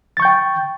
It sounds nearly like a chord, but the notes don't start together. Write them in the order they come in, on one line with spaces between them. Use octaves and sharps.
A6 C#6 G6 G5